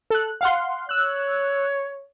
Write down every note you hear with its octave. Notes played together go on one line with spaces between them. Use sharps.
A4 F#6
F5 F#5 C6
C#5 E6 F#6